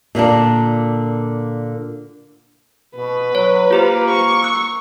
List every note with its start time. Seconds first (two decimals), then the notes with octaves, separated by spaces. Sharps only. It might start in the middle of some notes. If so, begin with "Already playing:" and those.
0.15 A#2 D3 A#3 D4
2.96 B2 B4
3.35 F#3 C#5
3.71 A#3 F4 G4 C5
4.10 C#6
4.42 E6 F#6